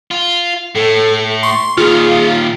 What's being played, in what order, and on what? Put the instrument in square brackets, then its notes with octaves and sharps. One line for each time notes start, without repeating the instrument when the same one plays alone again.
[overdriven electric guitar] F4
[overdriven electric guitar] A2 [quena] A4
[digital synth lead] C6 [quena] C#6
[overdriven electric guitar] A#2 D#3 [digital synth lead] F4 [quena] G#4